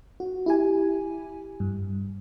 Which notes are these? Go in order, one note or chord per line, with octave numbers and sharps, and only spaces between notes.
F#4
E4 G4 G#5
G2